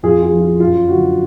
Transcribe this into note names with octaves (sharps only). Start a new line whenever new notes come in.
F2 F4 G#4
F4 G#4
F3
F4
F#2 F4
D3 F#3 F#4